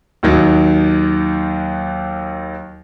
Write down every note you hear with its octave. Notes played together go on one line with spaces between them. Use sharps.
D#2 D#3 F#3